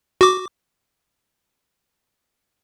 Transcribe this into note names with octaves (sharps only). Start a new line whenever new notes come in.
F#4 D6